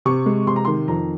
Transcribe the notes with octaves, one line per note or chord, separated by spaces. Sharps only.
C3 C#6
G#3
C3 C6
A#5
D#3 C6
F2 A#5